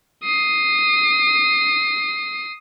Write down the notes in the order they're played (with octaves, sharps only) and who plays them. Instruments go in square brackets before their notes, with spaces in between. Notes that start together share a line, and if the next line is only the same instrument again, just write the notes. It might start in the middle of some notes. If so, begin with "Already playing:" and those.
[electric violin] D#6 C7